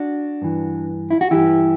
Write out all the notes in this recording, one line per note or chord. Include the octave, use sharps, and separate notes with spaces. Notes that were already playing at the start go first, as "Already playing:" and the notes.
Already playing: D4 F#4
G2 E3
E4
F#4
G2 E3 E4 G4